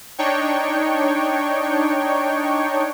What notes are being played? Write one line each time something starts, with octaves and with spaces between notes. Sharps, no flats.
D4 D#4 C#5 G5 C#6